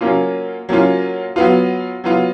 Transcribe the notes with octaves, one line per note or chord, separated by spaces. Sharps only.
F#3 A#3 C#4 F4
F#3 A#3 C#4 F4
F#3 B3 F4
F#3 B3 F4